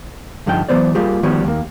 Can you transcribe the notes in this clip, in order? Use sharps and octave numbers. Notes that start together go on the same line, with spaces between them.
G2 D3 F3 D#4 G5
E3 F#3 B3 C5 D5
G3 A#3 F4 G4 G#4
D#3 F3 G3 B3 F#4 C#5
D#2 A#3